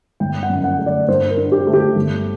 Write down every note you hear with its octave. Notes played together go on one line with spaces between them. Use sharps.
G1 G5
F#5
F#2
F#5
A3
D5
G2 C5
A#4
D3
G4
A3
G4
G1